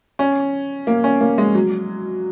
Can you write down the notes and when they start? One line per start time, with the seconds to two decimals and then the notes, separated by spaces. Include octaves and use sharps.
0.19 C#4
0.87 A#3
1.04 C#4
1.21 A#3
1.38 G#3
1.55 F#3